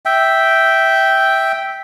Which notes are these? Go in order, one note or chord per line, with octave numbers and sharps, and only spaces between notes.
E5 G5